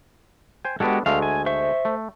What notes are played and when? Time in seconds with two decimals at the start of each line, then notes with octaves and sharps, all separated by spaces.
0.65 C5 G5 G#5
0.80 G#3 B3 D4 F#4 G4 A4
1.06 D2 G#3 A3 F5
1.22 G#5
1.46 C5 E5 C#6
1.85 A3